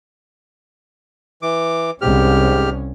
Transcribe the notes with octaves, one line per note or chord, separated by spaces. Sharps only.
E3 D6
C2 G#2 C#4 G4 F6